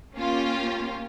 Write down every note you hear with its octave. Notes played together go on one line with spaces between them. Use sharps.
A#3 C#4 F4 G4